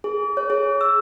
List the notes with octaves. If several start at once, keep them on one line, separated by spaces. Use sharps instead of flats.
G#4
C#5
G#4
E6